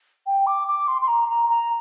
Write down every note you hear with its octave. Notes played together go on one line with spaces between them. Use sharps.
G5
D6
D6
C6
C6
A#5
A#5
A#5